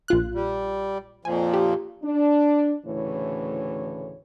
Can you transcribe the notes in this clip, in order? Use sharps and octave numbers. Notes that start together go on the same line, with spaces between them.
A#1 F4 F#6
G3
F2 A#2 F3 G#5
G4
D4
D2 A2 C#3 E3 C#5